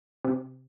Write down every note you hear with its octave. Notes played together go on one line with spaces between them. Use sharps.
C3